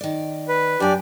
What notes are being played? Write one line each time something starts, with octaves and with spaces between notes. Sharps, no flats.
D#3 D5
B4
F#2 D4 G4 D5 G#5